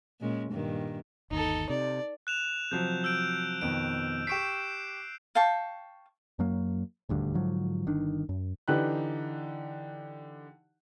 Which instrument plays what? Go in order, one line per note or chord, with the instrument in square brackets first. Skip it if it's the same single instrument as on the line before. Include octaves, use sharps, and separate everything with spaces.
[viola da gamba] A#2 G#3 C#4
G2 A#2 D#3
[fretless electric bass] G1 D#2 [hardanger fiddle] D#4 A4
[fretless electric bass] C3 [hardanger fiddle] D5
[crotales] F#6 E7 F7
[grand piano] C3 F3 F#3 [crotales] G6
[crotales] E6 G6 D7
[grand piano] F2 B2 D#3 [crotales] D7
[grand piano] G4 C#6 B6 [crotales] C7 D7 E7
[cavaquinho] F5 G5 A5 C#6
[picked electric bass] F#2 F#3 A#3
D#1 D2 G2 D3
G#2 D3 F3 F#3
G1 D#3 D4
F#2
[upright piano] D3 E3 D#4 G4 B4 F#6